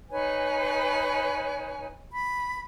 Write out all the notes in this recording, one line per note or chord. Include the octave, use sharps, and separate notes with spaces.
D#4 B4 C#5 G#5
B5